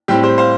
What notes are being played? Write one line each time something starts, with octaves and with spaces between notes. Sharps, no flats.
A2 G3 C4 G4
G4 C5
C5 F5